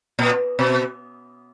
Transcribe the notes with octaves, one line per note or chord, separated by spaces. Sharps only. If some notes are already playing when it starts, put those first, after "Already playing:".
A#2
B2